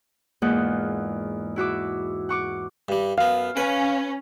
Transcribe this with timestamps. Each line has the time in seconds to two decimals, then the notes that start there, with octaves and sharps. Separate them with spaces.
0.42 E2 G#2 A#3 F4 F#5 G6
1.56 E4 F#4 E5 D6
2.29 F#5 C#6 D6
2.89 G2 G3
3.18 F#2 B3 F5
3.57 C#4 B4